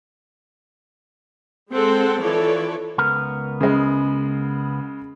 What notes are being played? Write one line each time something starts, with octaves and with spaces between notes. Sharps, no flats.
G#3 C4 G#4 A4 C5 F#5
E3 F3 A4 C#5 D5
C#2 B3 A#4
C#3 G#3